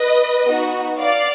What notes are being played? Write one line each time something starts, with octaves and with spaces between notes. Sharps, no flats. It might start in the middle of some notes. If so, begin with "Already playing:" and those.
Already playing: B4 D#5
B3 D#4 F#4
D5 F5